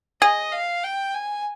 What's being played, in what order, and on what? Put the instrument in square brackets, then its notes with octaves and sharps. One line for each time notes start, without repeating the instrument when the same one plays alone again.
[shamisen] G#4 [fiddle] D#5
[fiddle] F5
G5
G#5